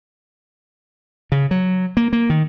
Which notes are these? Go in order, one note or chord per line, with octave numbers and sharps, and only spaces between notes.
C#3
F#3
A#3
A#3
D#3